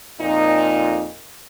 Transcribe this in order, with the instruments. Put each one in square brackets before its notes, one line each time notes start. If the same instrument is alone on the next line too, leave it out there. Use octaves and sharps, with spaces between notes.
[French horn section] F2 A#2 D#4